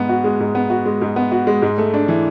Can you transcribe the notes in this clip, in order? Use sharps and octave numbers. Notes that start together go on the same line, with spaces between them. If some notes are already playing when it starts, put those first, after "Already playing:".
Already playing: G#2 B3
F#4
G#3
G#2
B3
F#4
G#3
G#2
B3
F#4
G#3
G#2
A3
D4
E3